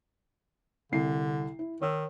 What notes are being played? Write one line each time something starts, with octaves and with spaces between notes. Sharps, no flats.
C2 D3 C7
E4
D#3 C#5 E6